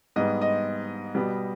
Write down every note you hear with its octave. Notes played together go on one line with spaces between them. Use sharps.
G#2 G3 B3 D#5
D#5
B2 G3 B3